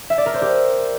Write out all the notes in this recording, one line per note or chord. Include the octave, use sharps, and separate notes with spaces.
E5
D5
A#4
C5
G4